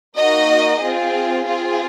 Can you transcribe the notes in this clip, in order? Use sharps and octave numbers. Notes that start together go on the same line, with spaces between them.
A#3 D#4 F#4 D#5
C4 F4 G#4
C4 F4 G#4